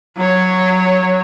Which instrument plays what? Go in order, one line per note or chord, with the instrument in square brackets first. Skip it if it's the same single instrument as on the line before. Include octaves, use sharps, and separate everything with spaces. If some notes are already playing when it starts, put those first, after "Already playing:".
[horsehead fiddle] F#3 C#5